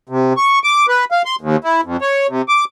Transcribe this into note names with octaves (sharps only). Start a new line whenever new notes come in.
C3
C#6
D6
B4
F5
C6
D#2
E4
F2
C#5
C3
D6